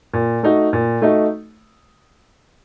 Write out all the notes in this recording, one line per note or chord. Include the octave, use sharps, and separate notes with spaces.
A#2
A3 D#4 F#4
A#2
A3 D#4 F#4